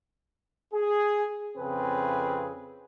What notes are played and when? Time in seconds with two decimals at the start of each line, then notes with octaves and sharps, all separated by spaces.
0.73 G#4
1.57 F2 C#3 C4 G#4 B4